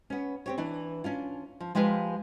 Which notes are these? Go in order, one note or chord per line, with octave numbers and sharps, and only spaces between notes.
B3 C#4
C4 G4 C#5
E3 D4
C#4 D4 F4
F3
F3 G#3 G4 B4 F5